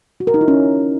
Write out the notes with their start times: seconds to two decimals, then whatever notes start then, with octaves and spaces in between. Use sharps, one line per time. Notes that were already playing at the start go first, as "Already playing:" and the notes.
0.20 F#4
0.27 A#4
0.34 D#4
0.41 E4
0.48 C#4